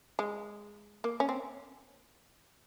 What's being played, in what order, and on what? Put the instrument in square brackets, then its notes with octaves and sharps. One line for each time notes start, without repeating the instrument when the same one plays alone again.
[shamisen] G#3
A#3
C#4
C4